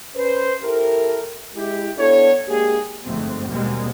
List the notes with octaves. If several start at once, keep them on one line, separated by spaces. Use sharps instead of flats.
C#4 B4 C5
E4 G4 A4 A#4
G#3 E4 G4
B3 D4 E4 A4 C#5
G#3 A#3 D4 G4 G#4
G1 F2 G#2 A3 C4
D#2 B2 G3 G#3 A#3 C4